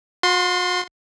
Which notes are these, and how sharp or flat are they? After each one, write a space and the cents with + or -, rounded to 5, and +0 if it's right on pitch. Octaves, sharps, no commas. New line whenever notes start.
F#4 -45 C6 +0